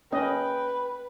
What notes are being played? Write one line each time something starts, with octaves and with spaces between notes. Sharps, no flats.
A#3 C#4 B4 D#5 G5